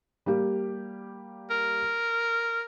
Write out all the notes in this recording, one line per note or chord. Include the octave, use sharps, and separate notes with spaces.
G3 A#3 G4
A#4